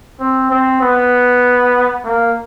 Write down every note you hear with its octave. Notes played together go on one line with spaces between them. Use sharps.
C4
C4
B3
A#3